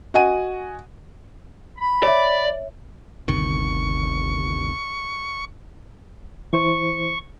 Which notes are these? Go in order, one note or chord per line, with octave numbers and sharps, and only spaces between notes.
F#4 D#5 F#5 G#5 D#7
B5
C#5 D5 E5
G1 D2 C3 D#3 C#6
E3 E4 C5 C#6